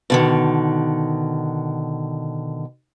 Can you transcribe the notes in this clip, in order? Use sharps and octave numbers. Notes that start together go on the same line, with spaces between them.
B2 D3 D#3